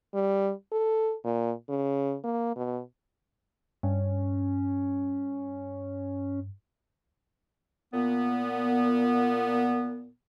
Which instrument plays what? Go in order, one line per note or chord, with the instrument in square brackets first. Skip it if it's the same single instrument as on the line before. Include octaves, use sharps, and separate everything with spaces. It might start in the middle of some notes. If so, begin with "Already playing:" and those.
[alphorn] G3
A4
A#2
C#3
A#3
B2
[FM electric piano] G2 [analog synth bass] C#4
[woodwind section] A#2 B3